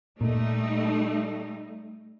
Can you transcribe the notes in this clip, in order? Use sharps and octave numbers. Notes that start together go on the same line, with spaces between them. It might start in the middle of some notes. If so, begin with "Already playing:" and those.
A#2 G3 A3 D#4